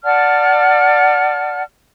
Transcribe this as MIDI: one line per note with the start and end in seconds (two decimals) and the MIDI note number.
0.04 1.63 74
0.04 1.63 78
0.04 1.63 81
0.04 1.63 89